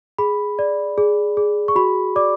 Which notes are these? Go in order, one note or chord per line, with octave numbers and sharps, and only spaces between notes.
G#4 B5
D5
G#4
G#4
C#6
F#4 B5
D5 D6